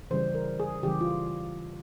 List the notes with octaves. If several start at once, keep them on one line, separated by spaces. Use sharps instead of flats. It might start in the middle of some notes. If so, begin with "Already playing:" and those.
C#3 E3 G3 C5
A#4
G#4
C#3 E3 G3 G4
F4